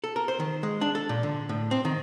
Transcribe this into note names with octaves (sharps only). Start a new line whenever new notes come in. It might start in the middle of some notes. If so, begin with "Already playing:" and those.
A4
A#4
C5
D#3
G#3
D4
A4
A#2
D3
A2
C4
D#3